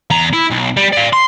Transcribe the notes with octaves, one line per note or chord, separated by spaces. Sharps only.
E2 A#5
E4
B1
G3
D5 F5
C6